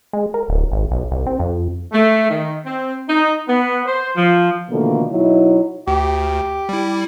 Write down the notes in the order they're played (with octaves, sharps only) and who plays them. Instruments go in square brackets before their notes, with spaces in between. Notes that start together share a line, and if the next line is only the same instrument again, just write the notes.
[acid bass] G#3
A#4
D1
G#1
B1
C2
C4
F2
[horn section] A3
D#3
C4
D#4
B3
C5
F3
[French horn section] B2 D3 D#3 F3 A3 A#3
B2 F#3 D#4 E4
[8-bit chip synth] D2 [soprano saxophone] G4
[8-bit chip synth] G3 E4